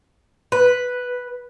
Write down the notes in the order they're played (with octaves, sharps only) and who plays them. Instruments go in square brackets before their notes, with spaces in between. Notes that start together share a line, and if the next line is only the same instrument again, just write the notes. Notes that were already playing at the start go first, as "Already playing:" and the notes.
[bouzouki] B4